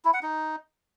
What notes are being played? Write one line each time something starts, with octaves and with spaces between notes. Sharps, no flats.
E4
F#5
D#4